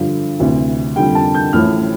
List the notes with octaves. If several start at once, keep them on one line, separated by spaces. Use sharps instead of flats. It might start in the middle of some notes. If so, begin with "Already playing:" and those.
Already playing: G2 D3 F3
D2 C3 E3
F2 D3 G3 G5
A5
G6
A1 A2 F3 F6